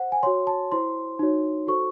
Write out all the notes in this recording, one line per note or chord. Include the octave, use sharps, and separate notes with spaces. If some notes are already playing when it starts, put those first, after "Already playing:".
Already playing: C5 F#5
G#5
F#4 C#5 C6
A5
E4 C5 C6
D#4 F#4 C#5
F#4 A4 C5 C#6